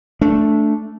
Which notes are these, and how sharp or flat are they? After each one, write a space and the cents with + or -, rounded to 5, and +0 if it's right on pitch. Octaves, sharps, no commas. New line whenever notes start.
A3 +0 D4 -10